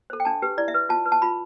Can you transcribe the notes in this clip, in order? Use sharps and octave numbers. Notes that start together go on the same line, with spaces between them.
A4 C5
G5
D4 A5
G4 B4
E4 D5
E5
B4
F4 A5
B4
A5
F4 B5